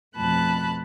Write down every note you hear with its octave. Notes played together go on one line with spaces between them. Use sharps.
F2 B2 A3 A5 B5 F#6